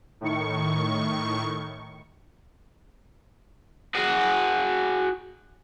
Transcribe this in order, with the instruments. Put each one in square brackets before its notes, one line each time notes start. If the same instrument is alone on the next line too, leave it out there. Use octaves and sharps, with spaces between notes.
[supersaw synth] A2 D#3 C#6
[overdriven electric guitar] F#4 G#4